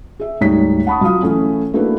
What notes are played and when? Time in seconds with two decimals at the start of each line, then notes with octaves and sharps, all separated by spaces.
0.20 G#4 E5
0.41 D2 G#2 G3 D#4 C#5 B6
0.87 F#5 A5 B5 C#6 D#6
1.01 F#3 F4 F5 D#6
1.22 E3 A3 C#4
1.74 A3 A#3 D4 E4 F#4 B4